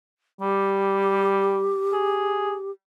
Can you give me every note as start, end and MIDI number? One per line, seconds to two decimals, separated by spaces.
0.41 1.71 55
0.41 2.71 67
1.93 2.55 68